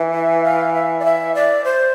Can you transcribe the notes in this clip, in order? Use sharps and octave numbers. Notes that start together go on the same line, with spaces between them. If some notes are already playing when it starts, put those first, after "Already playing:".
Already playing: E3
E5
F5
E5
D5
E5
D5
C5